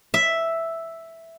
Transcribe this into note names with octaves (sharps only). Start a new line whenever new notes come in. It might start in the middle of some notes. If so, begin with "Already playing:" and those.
E5